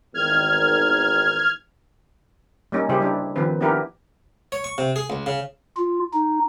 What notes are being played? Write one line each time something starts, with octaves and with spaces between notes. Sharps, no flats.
G#1 E2 D#3 F6 G#6
G3 A#3 C#4 D#4
C#3 G3 E4 G4 G#4 C5
G3 D4 E4
D#3 F3 C4 B4
B3 D4 E4 G4 A#4 B4
C#5
C#6
C3
G#4
C#2
C#3
F4
D#4